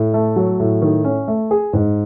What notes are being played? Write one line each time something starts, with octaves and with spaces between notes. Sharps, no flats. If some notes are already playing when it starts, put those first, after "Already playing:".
Already playing: A2
A3
F#3
A2
D#3
C#4
A3
G#4
G#2